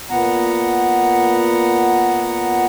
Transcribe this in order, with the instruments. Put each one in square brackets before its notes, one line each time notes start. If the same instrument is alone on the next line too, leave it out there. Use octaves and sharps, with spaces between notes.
[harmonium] A#2 B3 F#5 A#5